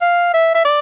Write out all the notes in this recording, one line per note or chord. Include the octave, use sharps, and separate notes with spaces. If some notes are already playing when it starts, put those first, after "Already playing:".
F5
E5
E5
D5